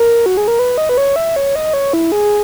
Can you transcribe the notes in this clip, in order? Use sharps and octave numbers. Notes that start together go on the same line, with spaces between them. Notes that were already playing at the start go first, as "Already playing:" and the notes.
Already playing: A#4
F#4
G#4
A#4
B4
D#5
B4
C#5
E5
C#5
D#5
C#5
E4
G#4